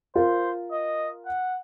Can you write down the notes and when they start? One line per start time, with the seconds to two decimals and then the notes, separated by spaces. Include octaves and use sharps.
0.15 F4 A#4 C5
0.72 D#5
1.26 F#5